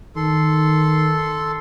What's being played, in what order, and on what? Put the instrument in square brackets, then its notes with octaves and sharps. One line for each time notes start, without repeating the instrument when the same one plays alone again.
[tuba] D#3 [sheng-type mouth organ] A4 C6